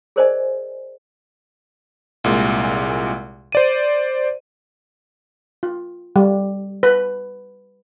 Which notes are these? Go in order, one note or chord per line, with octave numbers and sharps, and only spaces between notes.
G#4 A#4 C5 D5 D#5 G#5
C2 A#2 G#3
C5 D5 D#7
F4
G3
B4